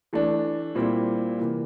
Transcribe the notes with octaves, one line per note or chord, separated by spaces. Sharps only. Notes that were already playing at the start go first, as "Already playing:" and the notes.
E3 A3 D4
A#2 G3 C4 E4
C3 E3 A#3